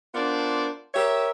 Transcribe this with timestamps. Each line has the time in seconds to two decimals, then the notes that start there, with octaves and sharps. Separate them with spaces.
0.15 B3 D4 F4 A#4 C5 D5
0.94 G4 A#4 C#5 E5